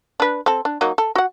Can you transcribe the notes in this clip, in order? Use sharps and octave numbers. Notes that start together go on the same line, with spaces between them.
D4 B4
C4 A4
D4
F#3 A#3 D#4
A4
F#4 F#5